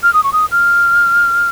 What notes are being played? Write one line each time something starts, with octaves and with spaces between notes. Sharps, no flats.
F6
D#6
C#6
D#6
F6